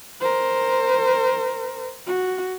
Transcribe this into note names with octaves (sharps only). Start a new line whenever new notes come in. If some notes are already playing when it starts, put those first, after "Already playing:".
A#4 C5
F#4